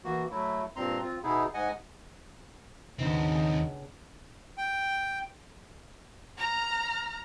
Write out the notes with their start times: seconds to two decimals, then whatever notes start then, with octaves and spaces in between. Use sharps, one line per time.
0.05 E3 A#3 F#4
0.30 F#3 A3 E4
0.76 G2 A#2 C4 A#5 C6
1.01 C4 F4
1.23 B2 B3 D#4 E4 G#4
1.54 G#2 D#5 F#5 G#5
2.99 D#2 C#3 B3 C4 D4 D#4
4.58 G5
6.38 A#5 F6